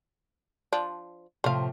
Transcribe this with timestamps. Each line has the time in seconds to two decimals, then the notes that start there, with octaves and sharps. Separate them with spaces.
0.73 F3 D4
1.44 A2 C3 F3 C5 F5